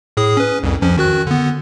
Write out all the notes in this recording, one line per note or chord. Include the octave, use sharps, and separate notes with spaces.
A2 G#4 D#6
C#4 B4
C2 F2
F2 F3 C#4
D#3 F#4 F#6
D3 B3